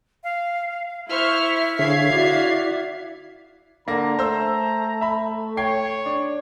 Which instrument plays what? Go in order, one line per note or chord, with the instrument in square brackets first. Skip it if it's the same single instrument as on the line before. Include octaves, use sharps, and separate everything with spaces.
[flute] F5
[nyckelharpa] E4 [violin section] C5 C#6 F6 [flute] E5
[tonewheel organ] D3 G#4 C#5 [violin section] F5 G#6 C7
[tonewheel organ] E4 D5 [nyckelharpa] F#4
[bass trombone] D3 [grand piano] A#3 A#6 [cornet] A#5
[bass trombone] A3 [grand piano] C5 E6
[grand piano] E5 B5
[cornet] C#5 [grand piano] G5 G#6 C7
[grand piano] D4